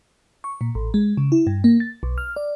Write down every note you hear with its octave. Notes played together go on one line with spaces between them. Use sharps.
C#6
A#2
A1
G#3
C#3
E4
G2
A#3
A6
B1
F6
D5